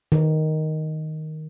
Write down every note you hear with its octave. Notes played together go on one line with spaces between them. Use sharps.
D#3